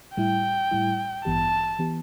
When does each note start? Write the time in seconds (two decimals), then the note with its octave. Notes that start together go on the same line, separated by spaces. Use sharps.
0.17 A2 G3 E4 G5
0.71 A2 G3 E4
1.25 A1 G2 E3 B3 G4 A5
1.79 E3 B3 G4